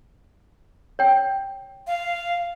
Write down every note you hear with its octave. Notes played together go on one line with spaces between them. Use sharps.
C#5 G5
F5